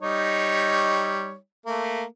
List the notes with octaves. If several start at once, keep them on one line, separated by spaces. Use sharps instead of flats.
G3 D#4 C#5
A3 A#3